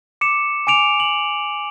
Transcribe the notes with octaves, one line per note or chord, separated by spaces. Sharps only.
D6 C#7 E7
G#5 D6 D7 F7
F#7